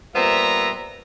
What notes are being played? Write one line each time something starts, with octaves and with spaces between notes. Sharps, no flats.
A#2 G3 B3 C5 E5 A#5